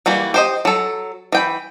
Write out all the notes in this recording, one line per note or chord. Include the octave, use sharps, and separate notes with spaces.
E3 G3 A#3 F#4
G4 C5 D#5
F#3 A4
E3 G5 B5